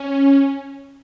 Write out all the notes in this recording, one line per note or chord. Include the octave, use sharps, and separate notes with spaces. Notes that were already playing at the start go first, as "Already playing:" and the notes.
Already playing: C#4